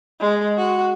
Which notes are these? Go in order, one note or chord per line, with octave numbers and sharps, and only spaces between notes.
G#3
F#4